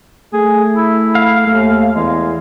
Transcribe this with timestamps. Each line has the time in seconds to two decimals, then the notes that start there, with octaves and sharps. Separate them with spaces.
0.33 A3 G#4
0.76 E4
1.15 F5
1.47 D#2 A3
1.95 E2 G#3